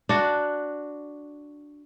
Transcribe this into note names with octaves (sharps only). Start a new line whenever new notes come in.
D4 F#4